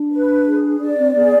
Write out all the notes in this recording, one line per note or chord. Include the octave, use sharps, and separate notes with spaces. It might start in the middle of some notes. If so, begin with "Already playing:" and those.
Already playing: D4
B4
G#4
D4 D5
C4
B3 G#4